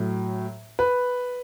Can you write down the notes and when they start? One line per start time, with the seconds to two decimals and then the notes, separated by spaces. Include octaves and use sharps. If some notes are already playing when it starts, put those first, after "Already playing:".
Already playing: A2 F#3
0.79 B4